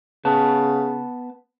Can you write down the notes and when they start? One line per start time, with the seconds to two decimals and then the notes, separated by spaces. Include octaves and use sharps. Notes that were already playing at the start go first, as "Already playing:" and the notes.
0.25 C#3 B3 B4 A5